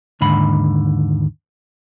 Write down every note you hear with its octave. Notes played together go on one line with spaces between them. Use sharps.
D#2 G#2 D3 B5